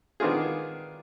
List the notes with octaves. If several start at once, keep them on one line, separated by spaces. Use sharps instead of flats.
D#3 B3 D4 F4 G#4